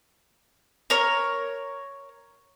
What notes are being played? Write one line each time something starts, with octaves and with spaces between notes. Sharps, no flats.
A#4 C#5